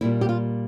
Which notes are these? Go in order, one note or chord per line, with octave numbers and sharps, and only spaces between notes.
A#2 G3 A#3 E4
G4
F4